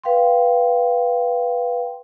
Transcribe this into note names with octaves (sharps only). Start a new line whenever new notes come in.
B4 F5 G5 C6